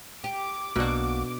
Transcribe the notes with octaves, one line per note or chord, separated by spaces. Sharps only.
G4 D6
B1 B2 A#3 D4 F#4